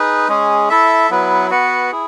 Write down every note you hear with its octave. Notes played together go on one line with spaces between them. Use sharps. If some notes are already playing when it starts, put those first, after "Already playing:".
Already playing: D#4 G#4 B4
G#3 C#4 G#4
E4 A4 E5
F#3 B3 E4 B4
B3 F#4 B4 F#5
E4 G#4